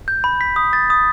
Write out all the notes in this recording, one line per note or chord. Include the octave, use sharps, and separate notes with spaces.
G6
B5
B6
D#6
A6
D#6